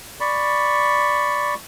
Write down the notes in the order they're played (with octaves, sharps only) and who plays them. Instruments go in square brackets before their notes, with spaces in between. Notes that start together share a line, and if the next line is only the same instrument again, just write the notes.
[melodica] D5 B5 C#6